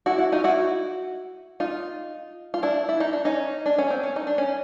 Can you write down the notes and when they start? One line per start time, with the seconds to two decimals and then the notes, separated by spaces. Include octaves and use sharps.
0.06 E4 F#4
0.18 E4 F#4
0.32 D#4 F4
0.44 E4 F#4
1.60 D#4 F4
2.54 F4
2.63 D4 E4
2.89 E4
3.00 D#4
3.13 D4
3.25 C#4 D#4
3.66 D4
3.78 C#4
3.90 C4
4.03 C#4
4.16 D#4
4.27 D4
4.38 C#4